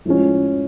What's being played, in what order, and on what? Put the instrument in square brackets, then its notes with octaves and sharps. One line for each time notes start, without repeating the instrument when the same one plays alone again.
[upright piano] A2 F3 G#3 C#4